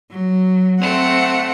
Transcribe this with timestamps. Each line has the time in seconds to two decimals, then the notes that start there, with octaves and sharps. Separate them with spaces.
0.11 F#3
0.80 A3 C4 F#5 C#7